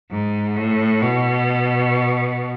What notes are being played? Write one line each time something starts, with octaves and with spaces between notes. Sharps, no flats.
G#2
A2
B2